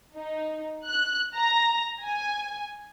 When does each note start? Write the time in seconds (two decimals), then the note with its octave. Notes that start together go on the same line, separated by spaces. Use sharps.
0.15 D#4
0.87 F#6
1.35 A#5
2.03 G#5